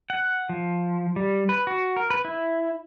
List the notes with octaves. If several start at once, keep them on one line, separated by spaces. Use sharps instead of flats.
F#5
F3
G3
B4
F#4
A#4
B4
E4